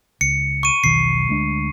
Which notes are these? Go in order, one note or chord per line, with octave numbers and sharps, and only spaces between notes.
C#2 C#7
C#6 D#7
E1 B1 D#3 C7
D2 G#3 D4